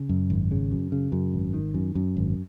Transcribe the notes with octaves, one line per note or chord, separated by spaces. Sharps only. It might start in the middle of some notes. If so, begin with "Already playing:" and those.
Already playing: C#3
F#2
G#1
C#3
F#2
C#3
F#2
G#1
D#3
F#2
F#2
G#1